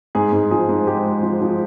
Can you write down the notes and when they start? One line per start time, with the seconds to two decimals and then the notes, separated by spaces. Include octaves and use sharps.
0.15 G#2 G#4
0.33 G#2
0.51 F3 G#4
0.69 G#2
0.87 G#3 G4
1.06 G#3
1.23 F3
1.42 F3